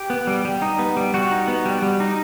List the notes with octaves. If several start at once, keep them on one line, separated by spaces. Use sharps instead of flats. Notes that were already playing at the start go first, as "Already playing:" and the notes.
Already playing: G4
B3
G3
G3
D#4
B3
G3
G3 F#4
D#4
B3
G3
G3
D#4